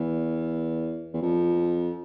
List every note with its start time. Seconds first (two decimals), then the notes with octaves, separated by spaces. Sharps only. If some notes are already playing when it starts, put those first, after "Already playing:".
Already playing: E2
1.14 E2
1.22 F2